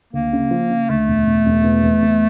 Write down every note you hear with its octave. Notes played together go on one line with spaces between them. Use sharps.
D2 A#3
C#3
F3
C#3
D2 A3
E1
E1
E1
E2
E2
E2